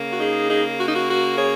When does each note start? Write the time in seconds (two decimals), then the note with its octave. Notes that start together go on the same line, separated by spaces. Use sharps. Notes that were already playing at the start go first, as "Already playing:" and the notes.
Already playing: C#3 A#3
0.11 F#4
0.20 D#4 G#4
0.49 D#4 G#4
0.78 F#4
0.86 D#4
0.93 F#4
1.08 F#4
1.38 G#4 C#5